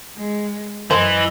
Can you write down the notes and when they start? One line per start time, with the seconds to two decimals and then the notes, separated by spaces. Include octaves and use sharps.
0.16 G#3
0.91 F#2 E3 A#4 C5 D#5